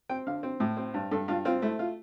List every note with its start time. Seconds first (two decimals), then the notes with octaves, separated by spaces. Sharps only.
0.09 C4 G5
0.27 D3 F5
0.43 C4
0.60 A2
0.77 C4
0.94 G2
1.11 G2 A4
1.28 G2 F4
1.45 C4 F4
1.62 A3 E4
1.79 F4